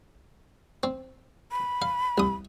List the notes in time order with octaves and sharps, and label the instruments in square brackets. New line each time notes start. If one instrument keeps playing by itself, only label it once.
[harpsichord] C4
[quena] B5
[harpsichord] F5
C2 D#6